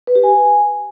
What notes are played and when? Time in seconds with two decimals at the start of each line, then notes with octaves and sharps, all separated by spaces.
0.07 B4
0.15 G4
0.24 G#5